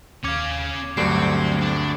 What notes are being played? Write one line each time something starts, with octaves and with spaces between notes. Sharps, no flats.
D#2 C#4 F5 D6 G#6
D2 G2 D3 F#3 C4 C7 C#7
D4